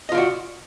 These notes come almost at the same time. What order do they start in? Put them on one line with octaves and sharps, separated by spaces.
D#5 F4 D5 F#4